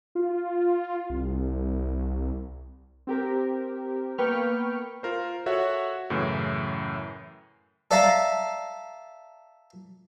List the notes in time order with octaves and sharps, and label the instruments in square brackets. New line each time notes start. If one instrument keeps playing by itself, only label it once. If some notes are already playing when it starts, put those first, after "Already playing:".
[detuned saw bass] F4
C2
[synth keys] C4 G4 A#4
A#3 B3 B4 G5 C#6 F6
[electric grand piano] F4 A#4 C5
F#4 A4 C#5 E5 F#5
F#2 A2 C#3 E3
[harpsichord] A4 D5 E5 F5 A5 A#5